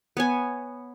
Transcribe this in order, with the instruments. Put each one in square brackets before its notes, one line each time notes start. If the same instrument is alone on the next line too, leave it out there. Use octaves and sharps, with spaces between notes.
[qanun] B3 C#5 G#5